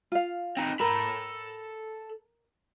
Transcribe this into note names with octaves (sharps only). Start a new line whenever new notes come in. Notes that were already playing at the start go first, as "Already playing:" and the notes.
F4 F5
C4 D#4
A4 A#4 B5